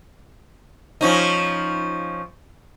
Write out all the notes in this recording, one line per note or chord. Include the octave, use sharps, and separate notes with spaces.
F3 C#4 D#4